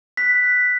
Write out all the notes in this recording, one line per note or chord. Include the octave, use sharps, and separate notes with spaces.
F#6 B6
F#6